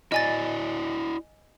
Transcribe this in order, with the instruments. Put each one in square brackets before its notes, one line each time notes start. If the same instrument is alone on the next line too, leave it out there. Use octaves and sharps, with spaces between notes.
[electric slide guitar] E4 F#4 D5 [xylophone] D#5 G#5 A6